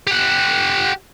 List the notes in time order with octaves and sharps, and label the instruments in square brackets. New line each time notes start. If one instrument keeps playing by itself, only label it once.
[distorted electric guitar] G4 F#5